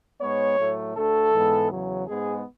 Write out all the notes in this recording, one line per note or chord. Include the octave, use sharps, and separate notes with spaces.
G#2 G#3 B3 C#5
A2 F#3 A3
D2 D3 A3 A4
G#2 E3 G#3 B3
E2 C#3 F#3
G#2 G#3 B3 G#4